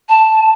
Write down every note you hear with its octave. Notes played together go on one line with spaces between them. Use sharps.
A5